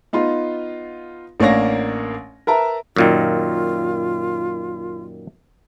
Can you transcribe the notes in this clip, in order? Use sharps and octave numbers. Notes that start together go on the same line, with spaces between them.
B3 D#4 F4 C6
A1 A#3 D4 C#5 F5 A#6
A#4 B4 E5 A5 A#5
F#2 A#2 D#3 F4